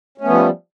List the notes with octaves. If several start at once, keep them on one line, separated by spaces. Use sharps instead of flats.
F3 G3 A3 B3 C#4